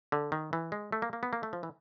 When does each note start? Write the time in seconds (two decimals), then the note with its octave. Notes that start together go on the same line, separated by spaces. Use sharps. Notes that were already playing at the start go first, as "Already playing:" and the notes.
0.12 D3
0.32 D#3
0.53 E3
0.72 G#3
0.92 A3
1.02 A#3
1.13 A#3
1.23 B3
1.33 A#3
1.43 A3
1.53 F3
1.63 E3